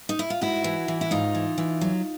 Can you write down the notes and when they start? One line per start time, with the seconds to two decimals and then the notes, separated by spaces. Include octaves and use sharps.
0.09 D#4
0.19 E4
0.30 F4
0.41 G#2 E4 F#4
0.64 E3
0.88 E3
1.01 E4
1.11 G#2 D#4 F4
1.35 E3
1.58 E3
1.81 F#3